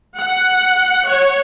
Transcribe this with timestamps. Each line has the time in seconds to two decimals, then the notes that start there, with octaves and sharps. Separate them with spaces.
0.18 F#5
1.09 C#5